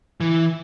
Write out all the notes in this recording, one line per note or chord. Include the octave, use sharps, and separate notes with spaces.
E3